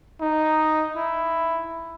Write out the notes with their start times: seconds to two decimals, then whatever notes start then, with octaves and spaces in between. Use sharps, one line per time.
0.21 D#4
0.96 E4